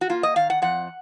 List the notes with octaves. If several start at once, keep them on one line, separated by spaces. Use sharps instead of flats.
F#4
A#3 F4
D#5
D#3 F5
F#5
F2 F#5